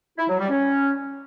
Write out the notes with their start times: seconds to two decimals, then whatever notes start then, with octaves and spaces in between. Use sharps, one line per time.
0.17 E4
0.28 F#3
0.38 G3
0.49 C#4